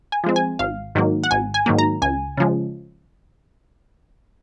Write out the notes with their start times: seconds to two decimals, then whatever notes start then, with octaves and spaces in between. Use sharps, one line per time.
0.12 G#5
0.24 F3 G#3 C4
0.36 G#5
0.59 G#1 F5
0.95 G#2 D#3 F#3 A#3
1.24 F#5
1.31 G#1 G#5
1.54 G#5
1.66 G#2 D#3 F#3 A#3
1.79 A#5
2.02 C#2 G#5
2.37 C#3 F3 G#3